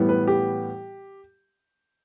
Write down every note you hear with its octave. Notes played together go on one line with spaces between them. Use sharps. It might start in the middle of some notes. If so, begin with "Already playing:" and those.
Already playing: A2 E3 G3 B3
B4
G4